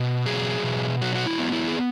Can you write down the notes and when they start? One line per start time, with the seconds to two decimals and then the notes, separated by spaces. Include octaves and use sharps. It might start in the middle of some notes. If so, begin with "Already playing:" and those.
Already playing: B2
0.26 F#3 G#4
0.63 B2
1.02 F#3 F#4
1.15 F#4
1.26 E4
1.39 B3
1.52 E4
1.68 G#4